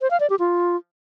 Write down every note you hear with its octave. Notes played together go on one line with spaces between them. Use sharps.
C5
F5
D5
G4
F4